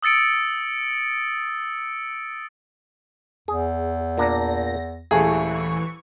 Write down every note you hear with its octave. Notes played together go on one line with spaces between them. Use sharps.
D#6 E6 A6 C#7 D7
E2 G#4
A#2 D4 A#5 A#6
D#1 E3 A3 G#4 C#6